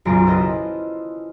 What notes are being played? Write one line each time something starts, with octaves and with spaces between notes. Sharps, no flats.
B1 F#2 C#3 F4 A#5 D7
E4 F4 A4 B4 C5 D#5